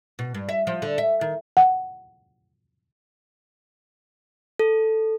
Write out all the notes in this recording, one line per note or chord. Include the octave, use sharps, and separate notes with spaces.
B2
G2
E5
F3
D3
E5
D#3
F#5
A4